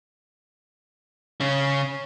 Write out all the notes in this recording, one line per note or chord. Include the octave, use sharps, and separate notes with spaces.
C#3 C#4